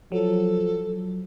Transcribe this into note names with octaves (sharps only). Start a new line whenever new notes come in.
F3 F#3 A4